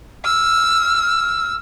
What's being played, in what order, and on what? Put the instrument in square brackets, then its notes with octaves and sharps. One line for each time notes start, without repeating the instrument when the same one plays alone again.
[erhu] E6 [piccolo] F6